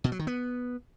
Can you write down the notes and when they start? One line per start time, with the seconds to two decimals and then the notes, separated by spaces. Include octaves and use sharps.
0.04 B2
0.12 F#3
0.19 D#3
0.27 B3